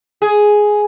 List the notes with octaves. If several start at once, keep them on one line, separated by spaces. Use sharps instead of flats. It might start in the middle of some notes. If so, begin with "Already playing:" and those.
G#4